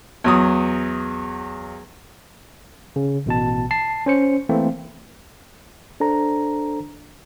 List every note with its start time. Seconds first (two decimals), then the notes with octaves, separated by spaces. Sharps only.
0.24 E2 F#3 D#6
2.96 C#3
3.26 A1 B2 A5
3.71 A5 C7
4.06 C#4 C5 C#7
4.49 E3 A3 A#3 C4
6.00 D4 A4 C5 A#5